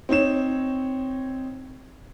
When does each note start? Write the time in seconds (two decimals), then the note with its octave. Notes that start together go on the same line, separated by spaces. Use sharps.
0.09 C4 D#4 C#5 E7